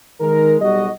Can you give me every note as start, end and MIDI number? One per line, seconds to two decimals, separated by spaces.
0.21 0.57 51
0.21 0.57 56
0.21 0.57 70
0.62 0.89 35
0.62 0.89 55
0.62 0.89 66
0.62 0.89 75